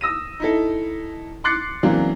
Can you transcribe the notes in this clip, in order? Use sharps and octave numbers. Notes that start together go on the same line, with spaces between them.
D#6 E6 A#6 D#7
D#4 E4 A4
C6 D6 F#6 A6 C7 C#7
C#3 E3 F#3 A#3 C4 D4